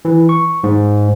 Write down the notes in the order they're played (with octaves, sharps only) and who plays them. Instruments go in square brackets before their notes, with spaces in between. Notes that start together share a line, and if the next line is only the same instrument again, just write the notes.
[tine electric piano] E3
C#6
G#2